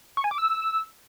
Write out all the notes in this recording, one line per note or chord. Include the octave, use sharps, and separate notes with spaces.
C#6
G#5
D6
E6